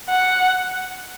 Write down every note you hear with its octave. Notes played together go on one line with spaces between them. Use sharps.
F#5